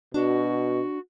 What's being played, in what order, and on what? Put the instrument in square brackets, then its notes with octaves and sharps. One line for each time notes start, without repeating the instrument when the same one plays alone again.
[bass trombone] B2 [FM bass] D4 [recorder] F#4